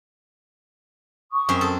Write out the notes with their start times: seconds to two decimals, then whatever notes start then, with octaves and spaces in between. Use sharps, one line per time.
1.32 C#6 D#6
1.49 F#2 C4 C5
1.61 A4